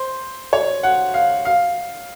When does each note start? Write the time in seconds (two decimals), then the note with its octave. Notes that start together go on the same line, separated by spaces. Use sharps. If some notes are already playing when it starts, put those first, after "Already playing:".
Already playing: C5
0.53 C#5
0.83 F#5
1.14 F5
1.45 F5